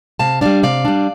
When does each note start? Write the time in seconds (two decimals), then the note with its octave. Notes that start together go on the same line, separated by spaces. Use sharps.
0.19 C3 F5 A5
0.41 G3 D4 D5 F5
0.63 C3 D5 F5
0.85 G3 D4